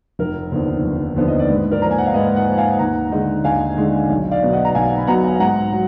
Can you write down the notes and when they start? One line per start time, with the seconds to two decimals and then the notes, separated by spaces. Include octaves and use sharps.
0.19 F1 A#4
0.52 D#2 D3 F3 B3
0.84 F1
1.16 D#2 D3 F3 B3
1.28 D#5
1.39 D5
1.50 G#2 B4
1.71 A#4 D5
1.82 F3 A#3 A#5
1.91 G#5
1.98 F#5
2.07 F5
2.14 G#2 B4 D#5
2.36 D#5 F#5
2.47 F3 A#3
2.58 F5 G#5
2.79 D#2 F#5 A#5
3.12 D3 G#3 D#4
3.44 D#2 F5 G#5
3.77 D3 G#3 D#4
4.09 B1
4.31 D5 F5
4.43 B2 F#3 B3
4.53 D#5 F#5
4.65 A#5
4.74 B1 F5 G#5
4.98 B5
5.07 B2 F#3 B3 F#5 A#5
5.40 G#2 F#5 A#5
5.73 F#3